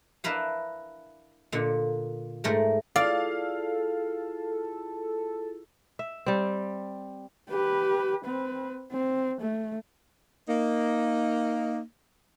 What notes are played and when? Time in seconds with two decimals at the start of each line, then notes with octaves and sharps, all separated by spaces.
0.24 D4 E4 A#4 B4 F5
1.52 A#2 D3
2.44 G#2 A3 A#4
2.96 E4 F4 G#4 A4 D5 F5
5.99 E5
6.26 G3 C4
7.49 G4 B4
8.25 C4 B4
8.91 C4
9.41 A3
10.48 A#3 D#4